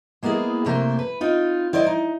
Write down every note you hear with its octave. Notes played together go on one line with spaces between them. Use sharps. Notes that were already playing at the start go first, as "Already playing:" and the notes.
G#3 A#3 B3 E4 G#4
C3 A3 A#3 C5
B4
C4 D#4 F4
E4 C5 D5 D#5
D#4